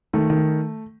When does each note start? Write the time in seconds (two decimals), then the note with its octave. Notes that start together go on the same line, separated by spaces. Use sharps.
0.13 D#3 A3
0.30 D#3